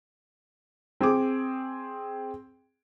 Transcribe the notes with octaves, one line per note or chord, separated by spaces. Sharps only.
C4 G#4 D6